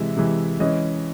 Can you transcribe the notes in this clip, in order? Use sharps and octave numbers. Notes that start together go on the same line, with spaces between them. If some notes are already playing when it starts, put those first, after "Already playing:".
Already playing: C3 E3 G#3 E5
C3 E3 G#3
E3 G#3 C#4 D#5